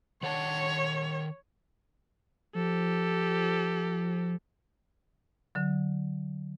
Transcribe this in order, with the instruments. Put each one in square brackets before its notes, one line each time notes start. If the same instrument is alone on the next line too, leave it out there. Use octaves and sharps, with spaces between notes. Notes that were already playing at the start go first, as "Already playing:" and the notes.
[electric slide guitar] D#3 F#5 A5 [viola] C#5
[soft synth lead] F3 [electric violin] G4 A4
[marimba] D3 F#3